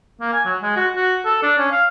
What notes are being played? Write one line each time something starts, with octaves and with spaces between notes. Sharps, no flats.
A#3
G#5
F#3
G#3
F#4
F#4
A4
D4
C#4
F5